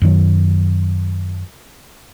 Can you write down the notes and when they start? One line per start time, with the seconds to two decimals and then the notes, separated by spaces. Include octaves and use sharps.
0.02 F#2 D#3 F#3